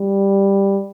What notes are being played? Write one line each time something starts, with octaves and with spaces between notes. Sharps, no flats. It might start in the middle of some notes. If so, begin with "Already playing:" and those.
Already playing: G3